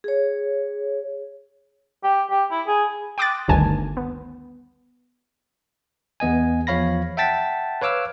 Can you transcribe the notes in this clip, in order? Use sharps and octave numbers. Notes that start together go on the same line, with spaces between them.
G#4 C#5
G4
G4
E4
G#4
G5 C6 D6 D#6 F#6 A6
G1 D2 G2 D#3 G#5 A5
B3
E2 B3 D#5 G#5
E2 F3 C#5 F5 B5 A#6
E5 F#5 G5 A5 A6 B6
B4 C#5 F5 D6 E6 F6